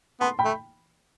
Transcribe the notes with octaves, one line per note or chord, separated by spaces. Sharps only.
B3 A5 C6
G5 B5
A3